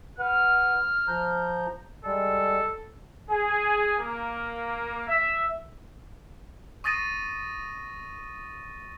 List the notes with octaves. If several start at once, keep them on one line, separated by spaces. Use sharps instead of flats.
B4 F#5 F6
F3 A#5 G6
G3 G#3 A4
G#4
A#3
E5
C#6 D#6 A6 A#6 D#7